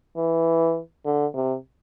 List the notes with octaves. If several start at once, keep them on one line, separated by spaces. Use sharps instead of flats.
E3
D3
C3